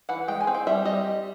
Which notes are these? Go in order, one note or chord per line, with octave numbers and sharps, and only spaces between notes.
E3 F#5
G#3 G5
G#5
C4
G5
G3 E5
G3 D#5